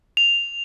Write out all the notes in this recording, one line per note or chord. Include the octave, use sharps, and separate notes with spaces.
F7